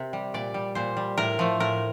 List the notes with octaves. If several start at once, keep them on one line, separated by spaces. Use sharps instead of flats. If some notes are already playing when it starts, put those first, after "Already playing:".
Already playing: C3 A#4
G3
A#2 D5
G3
A#2 C5
G3
A2 A#4
F3 A3
A2 A#4